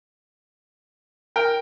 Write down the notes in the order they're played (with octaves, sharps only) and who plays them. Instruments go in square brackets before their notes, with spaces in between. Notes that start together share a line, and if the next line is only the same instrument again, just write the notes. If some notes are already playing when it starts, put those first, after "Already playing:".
[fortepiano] A#4 [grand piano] G5